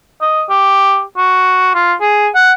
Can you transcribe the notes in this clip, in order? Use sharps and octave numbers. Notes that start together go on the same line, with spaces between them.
D#5
G4
F#4
F4
G#4
F#5